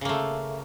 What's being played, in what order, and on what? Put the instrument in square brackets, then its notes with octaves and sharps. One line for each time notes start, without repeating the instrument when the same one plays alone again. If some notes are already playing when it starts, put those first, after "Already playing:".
[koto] C#3
A#3
A3